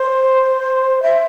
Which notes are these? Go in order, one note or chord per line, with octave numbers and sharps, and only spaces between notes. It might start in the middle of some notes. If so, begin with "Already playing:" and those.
Already playing: C5
E5